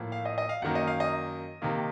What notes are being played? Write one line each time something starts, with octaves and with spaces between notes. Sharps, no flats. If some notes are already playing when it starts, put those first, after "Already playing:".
Already playing: A2 F3 A#3
F5
D#5
D#5
F5
F#2 D#3 A#3 F#5
D#5
F5
D#5
C3 D#3 A#3